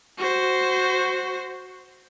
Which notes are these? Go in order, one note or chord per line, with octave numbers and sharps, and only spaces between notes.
F#4 C5